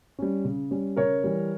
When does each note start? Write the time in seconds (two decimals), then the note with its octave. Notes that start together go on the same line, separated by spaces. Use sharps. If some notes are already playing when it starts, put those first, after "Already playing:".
0.19 G3 C#4
0.45 C#3
0.71 G3 C#4
0.96 C#3 A#4 C#5
1.24 E3 G3